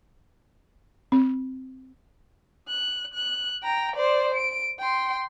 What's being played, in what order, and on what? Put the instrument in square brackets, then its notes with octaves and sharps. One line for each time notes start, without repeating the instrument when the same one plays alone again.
[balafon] C4
[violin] F#6
F#6
G5 A#5
C5 D5
D7
G5 C6